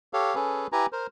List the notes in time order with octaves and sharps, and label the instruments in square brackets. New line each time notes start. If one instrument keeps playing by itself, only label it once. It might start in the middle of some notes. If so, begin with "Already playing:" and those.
[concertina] G4 A4 C#5 F5
C#4 G#4 A4 B4
E4 G4 B4 G#5 A#5
A#4 C5